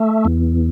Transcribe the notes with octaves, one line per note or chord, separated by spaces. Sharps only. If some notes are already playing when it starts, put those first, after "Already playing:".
Already playing: A3
E2